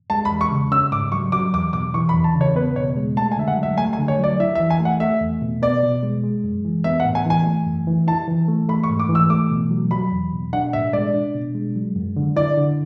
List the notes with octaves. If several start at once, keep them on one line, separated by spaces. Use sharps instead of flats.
G#3 A5
B5
E2
C#6
C#3
C#4 E6
G#2 D6
F#3 C#6
F#3 D6
E2 D6
B2 D6
E3 C#6
B5
E2
A5
C#3
C#5
B3 B4
B2 C#5
G#3
A3 A5
G#5
D3 E5
F#5
F#3
E5
A3 G#5
G#5
D3
C#5
F#3 D5
E4 E5
E5
E3
G#5
A3 F#5
A3 E5
E2
B2
B3 D5
B2
G#3
G#3
F#2
E3
B3 E5
F#5
A2
G#5
E3 G#5
A3
F#2
E3
E4 A5
E3
A3
A3 B5
C#6
G#2
D6
E3
E6
A3 D6
B2
F#3
F#3 B5
E2
B2
D4 F#5
A2 E5
G#3 D5
D4
B2
G#3
F#3
F#2
D3
E4 D5
D3